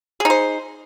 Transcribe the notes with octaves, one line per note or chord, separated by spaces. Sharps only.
D#4 G#4 C5